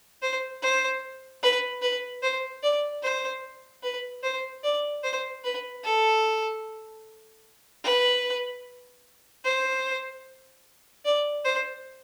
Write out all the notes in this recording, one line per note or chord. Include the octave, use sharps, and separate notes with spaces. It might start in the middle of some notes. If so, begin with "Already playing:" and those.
C5
C5
B4
B4
C5
D5
C5
B4
C5
D5
C5
B4
A4
B4
C5
D5
C5